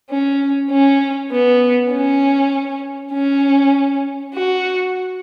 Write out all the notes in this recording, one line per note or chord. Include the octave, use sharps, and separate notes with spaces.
C#4
C#4
B3
C#4
C#4
F#4